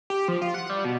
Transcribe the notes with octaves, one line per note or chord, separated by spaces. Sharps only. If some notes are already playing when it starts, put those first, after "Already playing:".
G4
F3
F4
F#5
G3
B2